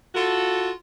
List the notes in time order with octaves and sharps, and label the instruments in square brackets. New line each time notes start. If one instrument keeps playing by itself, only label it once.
[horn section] F4 F#4 A4